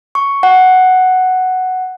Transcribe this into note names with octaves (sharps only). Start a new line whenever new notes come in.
C#6
F#5